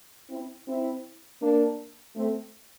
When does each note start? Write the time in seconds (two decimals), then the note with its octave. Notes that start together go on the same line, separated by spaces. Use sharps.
0.30 C4 E4
0.67 C4 E4
1.41 A#3 D4
2.16 A3 C4